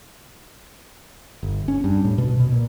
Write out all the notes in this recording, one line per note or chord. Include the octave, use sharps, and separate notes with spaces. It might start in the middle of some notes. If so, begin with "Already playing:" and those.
G1
C#4
G2
A2
B2
B2
A#2